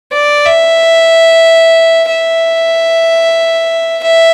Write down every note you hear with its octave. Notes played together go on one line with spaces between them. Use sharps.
D5
E5
E5
E5